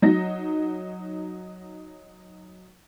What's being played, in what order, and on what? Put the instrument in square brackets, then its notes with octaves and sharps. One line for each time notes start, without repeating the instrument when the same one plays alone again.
[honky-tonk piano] F#3 D#4 A#6